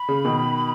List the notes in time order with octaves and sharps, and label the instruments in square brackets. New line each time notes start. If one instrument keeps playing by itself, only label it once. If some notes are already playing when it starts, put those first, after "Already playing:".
Already playing: [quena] B5
[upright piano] C#3
B2 D#3